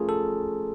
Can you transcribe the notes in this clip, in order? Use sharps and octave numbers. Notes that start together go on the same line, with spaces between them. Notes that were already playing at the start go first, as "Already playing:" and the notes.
Already playing: F3 A3 C#4 F4 G#4 A#4
A4